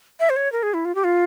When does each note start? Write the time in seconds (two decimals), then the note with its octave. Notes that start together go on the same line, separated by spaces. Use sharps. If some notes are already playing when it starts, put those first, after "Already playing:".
0.20 E5
0.30 C5
0.36 C#5
0.52 A#4
0.63 G#4
0.74 E4
0.85 F4
0.95 G4
1.04 F4